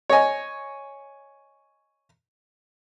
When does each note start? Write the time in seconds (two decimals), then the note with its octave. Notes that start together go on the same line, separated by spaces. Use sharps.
0.10 C#5 D#5 G#5